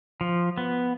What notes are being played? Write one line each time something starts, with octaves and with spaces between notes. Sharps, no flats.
F3
B3